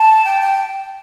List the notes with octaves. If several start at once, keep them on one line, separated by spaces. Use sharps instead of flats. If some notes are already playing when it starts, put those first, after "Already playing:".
Already playing: A5
G5
G5